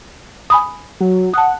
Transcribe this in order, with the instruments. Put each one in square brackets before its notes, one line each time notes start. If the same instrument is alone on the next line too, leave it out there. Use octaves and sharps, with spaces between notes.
[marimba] G#5 B5 D#6
[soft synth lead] F#3
[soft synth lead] F#5 [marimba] A5 D#6